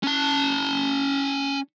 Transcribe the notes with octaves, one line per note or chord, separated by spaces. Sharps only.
C#4 A5